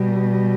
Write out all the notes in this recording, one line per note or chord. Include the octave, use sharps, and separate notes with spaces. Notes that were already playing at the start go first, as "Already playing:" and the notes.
Already playing: B2 G3